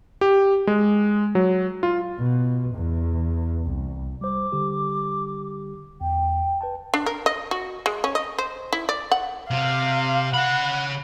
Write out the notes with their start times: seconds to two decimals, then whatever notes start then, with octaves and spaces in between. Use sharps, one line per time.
0.21 G4
0.67 G#3
1.35 F#3
1.83 F4
2.20 B2
2.75 E2
3.65 C2
4.21 G3 C5 D6
4.52 D3 G3 G4
6.01 E2 G5
6.61 B4 G5 A5
6.94 D4
7.06 A#4
7.26 D#5
7.51 F#4
7.86 G#3
8.04 C#4
8.15 D#5
8.39 C5
8.73 E4
8.89 D5
9.11 F#5
9.51 C3 F5
10.34 C#3 F#5 B5